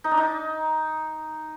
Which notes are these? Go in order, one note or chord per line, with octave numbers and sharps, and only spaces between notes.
D#4
D4
D#4